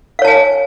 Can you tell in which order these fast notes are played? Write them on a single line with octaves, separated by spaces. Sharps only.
F5 C#5 A5 G#5